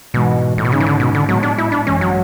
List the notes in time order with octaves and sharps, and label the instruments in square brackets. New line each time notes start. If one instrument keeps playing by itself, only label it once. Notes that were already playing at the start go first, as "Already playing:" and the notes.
[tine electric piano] G#2 E3 G#3 [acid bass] B2
[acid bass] A2
B2
[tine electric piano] G#2 G#3 C#4 [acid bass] C#3
[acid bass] E3
D3
B2
D3
[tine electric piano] A2 G#3 B3 [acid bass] F#3
[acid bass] D4
E4
D4
[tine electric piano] G#1 F#2 E3 G#3 [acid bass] C#4
[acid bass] F#3